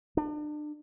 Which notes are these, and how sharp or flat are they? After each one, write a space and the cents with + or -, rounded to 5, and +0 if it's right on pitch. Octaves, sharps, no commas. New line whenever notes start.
D4 +35